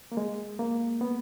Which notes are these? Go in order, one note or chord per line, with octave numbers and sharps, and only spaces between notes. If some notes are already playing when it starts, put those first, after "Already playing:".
A#3
G#3
A#3
B3